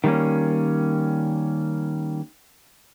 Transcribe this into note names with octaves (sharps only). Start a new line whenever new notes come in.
D#3 G3 A3 A#3 C#4